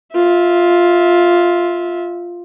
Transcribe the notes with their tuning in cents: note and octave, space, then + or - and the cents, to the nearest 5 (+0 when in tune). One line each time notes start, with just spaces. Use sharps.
F4 +0 E5 -20